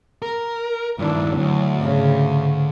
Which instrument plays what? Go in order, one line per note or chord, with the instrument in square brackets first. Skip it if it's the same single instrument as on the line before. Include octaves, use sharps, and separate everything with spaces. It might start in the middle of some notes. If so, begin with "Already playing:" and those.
[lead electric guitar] A#4
[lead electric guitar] G2 D#3 [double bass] D4 E4
[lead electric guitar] D2 [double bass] F#3
[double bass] G#2 C#3